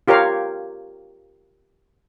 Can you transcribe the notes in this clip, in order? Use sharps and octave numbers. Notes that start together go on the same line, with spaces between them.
F4 G4 A#4 C#5 F5